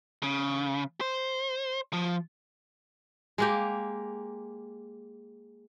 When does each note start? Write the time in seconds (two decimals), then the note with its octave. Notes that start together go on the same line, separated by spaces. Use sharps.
0.23 C#3
1.01 C5
1.93 F3
3.38 G#3 A#3 G4